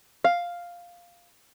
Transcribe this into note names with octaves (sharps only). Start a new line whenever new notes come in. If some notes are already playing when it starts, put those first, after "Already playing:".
F5